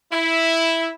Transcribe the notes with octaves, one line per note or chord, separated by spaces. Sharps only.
E4